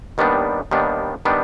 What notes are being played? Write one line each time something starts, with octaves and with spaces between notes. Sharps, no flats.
D#2 D#3 G3 B3 D4
D#2 D#3 G3 B3 D4
D#3 G3 B3 D4